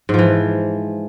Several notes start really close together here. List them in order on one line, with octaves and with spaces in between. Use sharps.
G#2 F3 E3